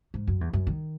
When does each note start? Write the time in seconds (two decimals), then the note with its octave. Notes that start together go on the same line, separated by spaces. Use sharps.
0.14 G#2
0.27 F#2
0.41 E2
0.53 F#2
0.67 D#3